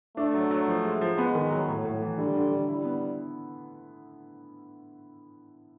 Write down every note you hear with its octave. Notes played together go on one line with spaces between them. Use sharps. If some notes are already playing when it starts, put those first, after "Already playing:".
A3 D4
F#3
F#3
F3
G#3
F3
G#3 B3
D#3
F#3
A2
A2
E3
D3 G3
D3
D3
G3 E4
B3